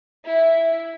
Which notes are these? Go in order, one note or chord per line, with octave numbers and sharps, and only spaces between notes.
E4